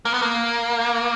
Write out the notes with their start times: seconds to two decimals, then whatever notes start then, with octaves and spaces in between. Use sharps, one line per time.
0.05 A#3
0.14 B3
0.22 A#3